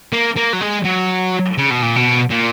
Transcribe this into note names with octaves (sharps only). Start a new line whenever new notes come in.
A#3
A#3
F#3
G#3
F#3
C#3
B2
A#2
B2
A#2